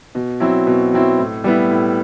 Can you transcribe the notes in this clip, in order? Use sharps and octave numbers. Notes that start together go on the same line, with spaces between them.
B2
F#3 C4 E4
B2
F#3 C4 E4
A2
G3 B3 E4
A2